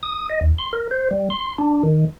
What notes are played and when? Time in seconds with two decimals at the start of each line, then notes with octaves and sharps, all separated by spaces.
0.03 D#6
0.30 D#5
0.41 D#2
0.58 C6
0.73 A#4
0.91 C5
1.11 G3
1.30 C6
1.58 D4
1.83 D#3